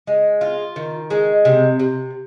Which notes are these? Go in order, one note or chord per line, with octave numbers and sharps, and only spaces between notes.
G#3
F4
D#3
G#3
C3
C3